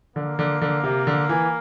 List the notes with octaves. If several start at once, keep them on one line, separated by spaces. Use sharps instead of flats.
D3 A#3
D3
D3
C3
D3
E3